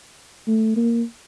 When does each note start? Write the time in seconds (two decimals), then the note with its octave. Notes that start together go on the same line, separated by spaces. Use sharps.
0.47 A3
0.76 A#3